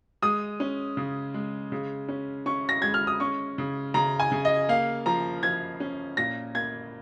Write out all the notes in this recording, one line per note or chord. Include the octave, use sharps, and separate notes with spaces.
G#3 D#6
C#4
C#3
G#3
C#3
C#4
C#4 C#6
A#6
G#3 G#6
F6
D#6
C#4 C#6
C#3
C#3 A#5
G#5
C#3
D#5
A#3 F5
F3 A#5
F3 G#6
C#4
A#2 A#6
A#3 G#6